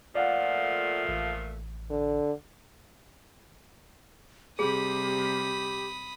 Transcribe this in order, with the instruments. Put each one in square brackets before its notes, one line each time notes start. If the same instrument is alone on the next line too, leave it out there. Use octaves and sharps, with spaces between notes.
[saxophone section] A#2 F3 A3 [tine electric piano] D5 F5 F#5
[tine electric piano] A1
[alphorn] D3
[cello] C3 G3 [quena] G4 [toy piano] G#4 [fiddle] B5 D#6